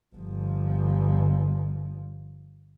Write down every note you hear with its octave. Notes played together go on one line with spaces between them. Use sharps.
G1 F3